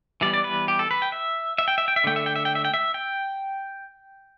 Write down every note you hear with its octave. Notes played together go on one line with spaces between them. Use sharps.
E3 G3 B3 D5
D5
B4
G4
A4
B4
G5
E5
E5
G5
E5
G5
E5
D3 A3 G5
E5
G5
E5
G5
E5
G5
E5
G5